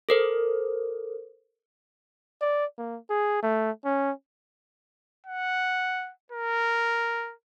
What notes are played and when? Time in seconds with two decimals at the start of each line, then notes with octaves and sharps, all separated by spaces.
0.09 A4 A#4 C5
2.41 D5
2.78 A#3
3.10 G#4
3.42 A3
3.85 C#4
5.27 F#5
6.32 A#4